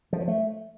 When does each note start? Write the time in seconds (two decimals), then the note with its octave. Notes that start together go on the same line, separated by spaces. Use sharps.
0.13 F3
0.20 F#3
0.28 A3